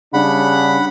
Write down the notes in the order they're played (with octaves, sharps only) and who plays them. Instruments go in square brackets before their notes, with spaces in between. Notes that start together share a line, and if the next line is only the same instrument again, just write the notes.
[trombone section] C#3 G3 D4 [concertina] F#5 B5